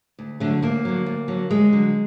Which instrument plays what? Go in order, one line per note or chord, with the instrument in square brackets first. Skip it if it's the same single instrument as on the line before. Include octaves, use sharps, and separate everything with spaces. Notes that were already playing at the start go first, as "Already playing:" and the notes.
[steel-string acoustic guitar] D2
D3 F#3 A3
D2 A#3
D3 F#3
D2
D3 F#3
D2 G#3
D3 F#3